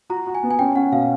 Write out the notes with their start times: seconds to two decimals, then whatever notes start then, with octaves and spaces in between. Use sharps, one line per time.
0.10 F#4 A#5
0.27 F#4
0.35 G#5
0.43 B3
0.51 G#5
0.59 C#4 G5
0.76 C#4 F#5
0.92 B2 F5